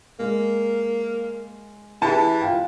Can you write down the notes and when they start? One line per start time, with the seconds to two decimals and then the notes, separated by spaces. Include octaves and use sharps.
0.20 G#3 A#3
2.02 E3 E4 G4 G#4 A5
2.42 F4 F5 G5